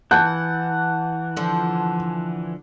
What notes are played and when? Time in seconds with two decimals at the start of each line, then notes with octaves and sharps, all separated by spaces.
0.11 E3 F#5 A5 G6
1.36 D3 F3